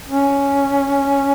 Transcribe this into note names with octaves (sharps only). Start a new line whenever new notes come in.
C#4